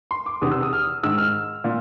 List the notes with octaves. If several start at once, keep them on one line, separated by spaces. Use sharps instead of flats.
C6
D6
E2 C3 D#3 D#6
E6
D#6
F6
G#2 D#3 E6
F6
A#2